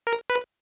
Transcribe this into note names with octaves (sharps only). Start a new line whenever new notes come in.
A#4
B4